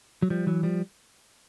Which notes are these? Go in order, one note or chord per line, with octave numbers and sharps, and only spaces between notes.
F#3
F3 G3
E3 F#3
F3 G3